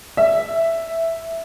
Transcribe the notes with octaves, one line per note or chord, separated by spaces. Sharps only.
E5